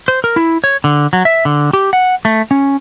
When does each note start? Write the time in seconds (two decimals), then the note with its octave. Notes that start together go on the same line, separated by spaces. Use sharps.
0.08 C5
0.24 A#4
0.36 E4
0.64 C#5
0.84 D3
1.13 F#3
1.25 E5
1.45 D3
1.73 G4
1.93 F#5
2.25 A3
2.51 C#4